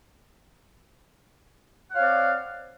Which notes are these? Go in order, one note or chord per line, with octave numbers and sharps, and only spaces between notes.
C4 C#5 D5 F5 F#5